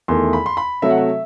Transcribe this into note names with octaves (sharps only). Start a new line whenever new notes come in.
E2 D#3 A3 C6
B5
C6
B5
C3 F#3 A3 E5
F#5
E5